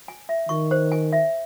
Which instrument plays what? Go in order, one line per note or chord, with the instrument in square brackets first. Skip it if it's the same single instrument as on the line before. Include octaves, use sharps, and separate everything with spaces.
[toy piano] G#5
E5
[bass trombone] D#3 [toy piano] C#6
[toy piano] C5
G#5
E5